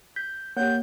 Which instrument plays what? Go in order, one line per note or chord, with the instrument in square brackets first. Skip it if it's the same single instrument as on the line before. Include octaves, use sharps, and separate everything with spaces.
[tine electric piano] G6 [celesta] B6
[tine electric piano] A#3 [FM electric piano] G4 F#5 [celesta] C#5 [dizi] G6